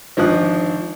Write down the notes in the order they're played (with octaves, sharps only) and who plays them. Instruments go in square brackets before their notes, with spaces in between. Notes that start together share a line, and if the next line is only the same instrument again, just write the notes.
[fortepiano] G#1 D3 F3 D#6 F#6